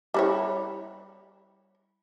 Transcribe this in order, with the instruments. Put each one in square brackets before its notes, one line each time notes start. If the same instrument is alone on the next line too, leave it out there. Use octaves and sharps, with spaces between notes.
[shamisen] G3 E4 C#5